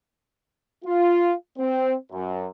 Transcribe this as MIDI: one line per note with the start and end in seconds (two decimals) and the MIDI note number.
0.84 1.33 65
1.58 1.94 60
2.12 2.46 42